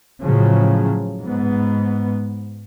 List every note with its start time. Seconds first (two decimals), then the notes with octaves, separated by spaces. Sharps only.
0.20 A2 C#3 F3 F#3
1.22 G#2 B3